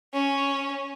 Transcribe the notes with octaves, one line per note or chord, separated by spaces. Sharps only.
C#4